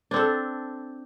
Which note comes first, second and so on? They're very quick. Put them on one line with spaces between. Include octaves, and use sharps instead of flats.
D4 C4 A4